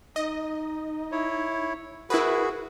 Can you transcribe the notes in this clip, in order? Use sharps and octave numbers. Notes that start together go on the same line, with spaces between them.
D#4 D#5
E4 C#5
E4 F#4 G#4 A#4 B4